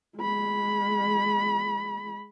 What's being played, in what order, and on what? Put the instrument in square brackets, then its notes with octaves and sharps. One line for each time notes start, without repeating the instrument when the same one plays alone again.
[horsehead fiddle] G#3 B5